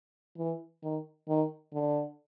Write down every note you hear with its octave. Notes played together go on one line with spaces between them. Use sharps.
E3
D#3
D#3
D3